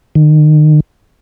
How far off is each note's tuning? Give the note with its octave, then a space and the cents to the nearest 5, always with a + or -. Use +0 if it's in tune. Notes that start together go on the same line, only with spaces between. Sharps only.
D#3 -35